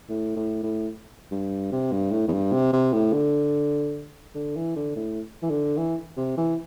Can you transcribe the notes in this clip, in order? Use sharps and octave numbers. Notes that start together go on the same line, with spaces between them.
A2
A2
A2
G2
C3
G2
A2
E2
G2
C3
C3
A2
D3
D3
E3
D3
A2
E3
D3
E3
C3
E3